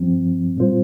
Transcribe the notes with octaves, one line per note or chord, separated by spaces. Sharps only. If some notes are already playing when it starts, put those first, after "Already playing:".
Already playing: G2 F3 C4
A#2 G3 C4 F4 C5